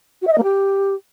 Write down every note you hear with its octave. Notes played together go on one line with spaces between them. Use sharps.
F#4
E5
D#5
A#3
G4